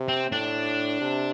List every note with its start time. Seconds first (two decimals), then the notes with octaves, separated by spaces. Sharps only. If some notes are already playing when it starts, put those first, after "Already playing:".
Already playing: C3
0.08 C4
0.31 A2 D4
1.01 C3